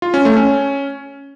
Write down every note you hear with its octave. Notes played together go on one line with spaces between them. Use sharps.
F4
C#4
A3
C#4